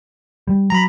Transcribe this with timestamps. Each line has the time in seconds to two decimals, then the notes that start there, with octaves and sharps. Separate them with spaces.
0.47 G3
0.70 F#3 A#5 B5